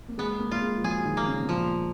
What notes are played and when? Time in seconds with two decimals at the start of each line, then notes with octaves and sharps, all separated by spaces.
0.09 A#3
0.18 G#3 B3
0.40 A#3
0.51 F4
0.62 G#3
0.78 F3
0.83 F#3 G#4
1.05 D#3
1.17 A#3
1.27 C#3
1.43 B2
1.49 A#2 F3